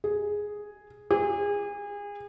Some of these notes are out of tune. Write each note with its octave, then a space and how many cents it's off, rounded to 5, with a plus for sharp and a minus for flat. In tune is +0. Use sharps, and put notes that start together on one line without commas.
G#4 +0
G#4 -30